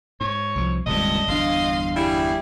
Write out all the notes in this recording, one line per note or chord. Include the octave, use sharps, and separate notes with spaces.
G#2 C#5
C2 F3
D#1 C#2 G2 C3 D#5 A5 A#6
G1 E2 D4 F5 C6
G3 E4 G#4